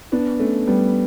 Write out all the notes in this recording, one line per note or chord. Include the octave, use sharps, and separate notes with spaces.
B3 D4
A3 C#4
G3 B3